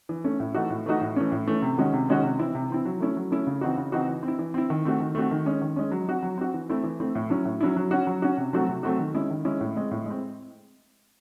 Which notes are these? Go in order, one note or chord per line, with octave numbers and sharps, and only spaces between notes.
E3
A3 C#4
A2
E3 A3 D#4 F#4
A2
E3 A3 D#4 F#4
A2
E3 A3 C#4
A2
E3 A3 C#4
C3
D#3 G#3 C#4 F#4
C3
D#3 G#3 C#4 F#4
C3
E3 C4 E4
C3
E3 C4 E4
F#3
A3 C#4 E4
F#3
A3 C#4 E4
C#3
E3 C4 D#4 F#4
C#3
E3 C4 D#4 F#4
E3
C4
E4
E3
C4 E4
D#3
A3 C4 F#4
D#3
A3 C4 F#4
D#3
G#3 C#4
D#3
G#3 C#4
F#3
C4 F#4
F#3
C4 F#4
E3
A3 C4 E4
E3
A3 C4 E4
A2
F#3 C#4 E4
A2
F#3 C#4 E4
F#3
C#4 F#4
F#3
C#4 F#4
C3
F#3 A3 C4 F#4
C3
F#3 A3 C4 F#4
D#3
G#3 C#4 E4
D#3
G#3 C#4 E4
A2
G#3 C4
A2
G#3 C4